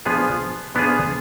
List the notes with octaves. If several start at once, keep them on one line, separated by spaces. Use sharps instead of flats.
F3 B3 D4 F4 G#4
F3 B3 D4 F4 G#4